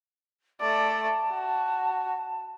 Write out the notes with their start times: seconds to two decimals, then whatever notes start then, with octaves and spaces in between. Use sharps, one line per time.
0.60 A3 D5 A5
1.31 F#4